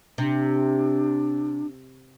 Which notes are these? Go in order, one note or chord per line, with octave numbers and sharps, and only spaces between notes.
C3 D4